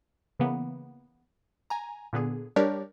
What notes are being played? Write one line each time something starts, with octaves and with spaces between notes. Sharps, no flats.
C#3 E3 A#3 B3
G#5 A#5
A#2 D3 B3 G#4
G3 D4 G4 A#4 C#5 D5